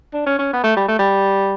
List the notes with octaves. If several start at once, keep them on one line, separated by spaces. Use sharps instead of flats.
D4
C#4
C#4
B3
A3
G3
A3
G3